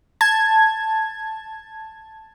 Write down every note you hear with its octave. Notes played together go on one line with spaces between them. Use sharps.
A5 G#6